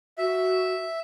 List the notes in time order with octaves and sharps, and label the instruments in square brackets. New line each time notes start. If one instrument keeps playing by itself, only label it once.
[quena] F#4 [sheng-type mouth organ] E5